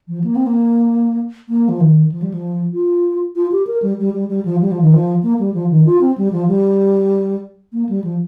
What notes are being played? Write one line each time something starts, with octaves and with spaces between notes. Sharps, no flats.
F3
A#3
C4
A#3
A#3
F3
D#3
F3
G3
F3
F4
F4
G4
A#4
G3
G3
G3
G3
F3
G3
F3
D#3
F3
A#3
G3
F3
D#3
F4
C4
G3
F3
G3
A#3
G3
F3